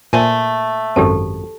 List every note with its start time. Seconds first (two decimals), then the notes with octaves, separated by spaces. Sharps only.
0.13 A#2 A3 C5 G#5
0.96 G#1 F#2 C4 G4 A4 A5